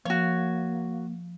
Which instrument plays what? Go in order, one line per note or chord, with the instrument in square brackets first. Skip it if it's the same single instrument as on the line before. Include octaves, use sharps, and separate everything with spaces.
[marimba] F3 [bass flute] A#3 [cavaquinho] F#4 C#5